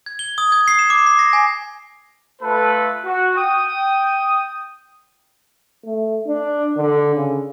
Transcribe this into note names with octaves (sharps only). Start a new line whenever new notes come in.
G#6
G7
D#6
G#6
C7
E7
D6
C7
A#6
G#5
A3 F4 A4 B4 B5
F#4
G5 D#6
A3
D4
D3
C#3